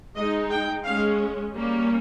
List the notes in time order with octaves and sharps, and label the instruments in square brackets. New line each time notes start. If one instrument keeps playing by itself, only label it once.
[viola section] G#3 D#4 D#5
G5
G#3 C#4 F5
G3 A#3 C#4